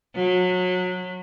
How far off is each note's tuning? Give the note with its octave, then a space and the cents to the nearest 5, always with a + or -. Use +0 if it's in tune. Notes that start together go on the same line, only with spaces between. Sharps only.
F#3 -25